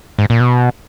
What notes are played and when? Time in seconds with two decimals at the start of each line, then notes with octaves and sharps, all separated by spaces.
0.19 G#2
0.30 A#2
0.40 B2